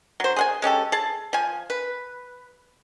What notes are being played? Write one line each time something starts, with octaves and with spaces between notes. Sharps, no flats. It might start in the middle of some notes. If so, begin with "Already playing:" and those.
F#3 C5
G#4 F#5 G#5
G#3 C#4 G4 A4
G#4 A5
F3 G#5
B4